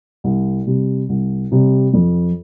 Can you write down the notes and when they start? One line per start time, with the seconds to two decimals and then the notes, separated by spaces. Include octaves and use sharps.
0.24 C2
0.67 C3 G3
1.09 C2
1.51 C3 G3
1.94 F2